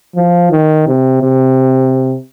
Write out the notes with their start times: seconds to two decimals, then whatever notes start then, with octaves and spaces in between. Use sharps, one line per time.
0.16 F3
0.51 D#3
0.87 C3
1.22 C3